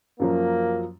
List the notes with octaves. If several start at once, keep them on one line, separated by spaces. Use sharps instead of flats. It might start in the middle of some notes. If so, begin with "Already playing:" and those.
F#2 F3 F#3 A#3